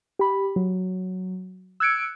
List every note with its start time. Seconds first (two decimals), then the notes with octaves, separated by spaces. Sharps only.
0.19 G4 B5
0.56 F#3
1.80 E6 F#6 G#6 C#7 D7